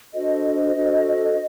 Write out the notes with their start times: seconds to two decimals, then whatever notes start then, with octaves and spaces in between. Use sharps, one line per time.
0.13 D4 F#4 A4 C5 D#5
0.75 D4 F#4 A4 C5